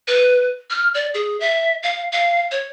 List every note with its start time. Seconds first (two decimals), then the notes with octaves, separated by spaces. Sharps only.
0.08 B4
0.70 F6
0.94 D5
1.14 G#4
1.40 E5
1.83 F5
2.12 F5
2.51 C#5